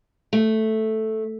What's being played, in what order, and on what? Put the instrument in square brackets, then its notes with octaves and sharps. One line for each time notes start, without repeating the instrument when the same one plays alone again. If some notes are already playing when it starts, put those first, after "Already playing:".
[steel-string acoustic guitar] A3